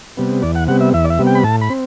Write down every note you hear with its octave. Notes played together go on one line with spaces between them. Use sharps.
C3 G3 B3
E2 D5
F#5
C3 G3 B3 F#5
E5
E2 E5
D5
E5
C3 G3 B3
G5
B5
A2 A5
B5
C4